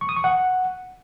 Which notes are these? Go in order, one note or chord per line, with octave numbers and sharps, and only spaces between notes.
C#6
D#6
C#6
F#5